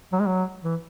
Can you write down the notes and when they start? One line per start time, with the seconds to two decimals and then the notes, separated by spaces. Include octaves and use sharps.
0.12 F#3
0.20 G#3
0.27 F#3
0.64 E3